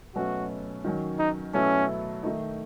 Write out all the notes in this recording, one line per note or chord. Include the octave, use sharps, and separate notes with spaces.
B2 F#3 A3 C#4 F#4
D#3 F#3 C#4
D#4
B2 F#3 A3 C#4 E4 A4
D#3 A3 D#4